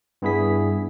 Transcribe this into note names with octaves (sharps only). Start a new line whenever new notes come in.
G2 B3 E4 G#4 B6